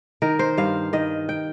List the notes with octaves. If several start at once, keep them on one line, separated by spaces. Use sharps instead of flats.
D#3 A#4
C5
G2 F5
D#3 D#5
G5